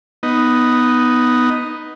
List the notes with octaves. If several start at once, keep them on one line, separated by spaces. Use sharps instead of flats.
B3 D#4